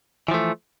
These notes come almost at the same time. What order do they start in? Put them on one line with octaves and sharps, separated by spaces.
E3 F3 A3